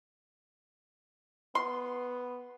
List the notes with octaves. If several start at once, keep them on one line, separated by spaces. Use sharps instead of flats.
B3 C6